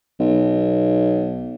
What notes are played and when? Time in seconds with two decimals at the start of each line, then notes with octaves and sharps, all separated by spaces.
0.20 B1